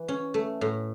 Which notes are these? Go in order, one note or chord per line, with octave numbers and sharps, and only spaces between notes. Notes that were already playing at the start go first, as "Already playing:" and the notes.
Already playing: E3
C#4
A3
A2